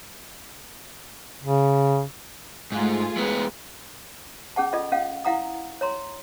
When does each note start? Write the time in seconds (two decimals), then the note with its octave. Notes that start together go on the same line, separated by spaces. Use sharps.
1.41 C#3
2.72 G#2 A3 F4 G#4
3.17 G#3 B3
4.56 C#4 G#4 F#5 A5
4.73 F4 A4 D5 D#5
4.92 C#4 F5 F#5
5.25 E4 F5 F#5 A#5 D#6
5.81 C#5 A#5 C6